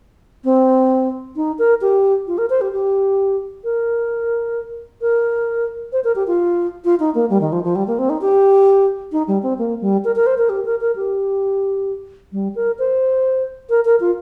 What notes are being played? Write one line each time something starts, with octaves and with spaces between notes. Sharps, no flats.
C4
D#4
A#4
G4
F4
A#4
C5
G4
G4
A#4
A#4
C5
A#4
G4
F4
F4
D#4
A#3
G3
D#3
F3
F3
G3
A#3
C4
D#4
G4
D#4
G3
C4
A#3
G3
A#4
A#4
C5
A#4
G4
A#4
A#4
G4
G3
A#4
C5
A#4
A#4
F4